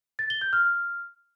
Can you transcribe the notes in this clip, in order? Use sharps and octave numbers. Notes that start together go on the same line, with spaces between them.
A6
G7
G6
F6